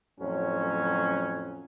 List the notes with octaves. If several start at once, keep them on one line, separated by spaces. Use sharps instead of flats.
F2 A2 F#3 C#4